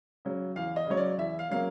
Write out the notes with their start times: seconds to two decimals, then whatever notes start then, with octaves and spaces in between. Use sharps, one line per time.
0.25 C#3 F#3
0.56 E2 F5
0.76 D#5
0.86 C#3 F#3 C#5
0.97 D5
1.18 E2 E5
1.39 F5
1.50 C#3 F#3 A#3 F5